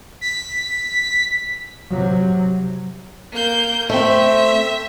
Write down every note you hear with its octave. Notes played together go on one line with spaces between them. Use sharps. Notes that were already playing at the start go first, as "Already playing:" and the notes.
B6
C3 F#3
A#3 G6
A3 C4 E5